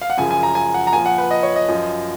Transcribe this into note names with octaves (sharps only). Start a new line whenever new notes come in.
F5
F#5
F#2 C#3 F3 G#5
G#5
A#5
G#5
F#5
A#5
A#2 F3 G#5
F#5
B4
D#5
C#5
D#5
F#2 F3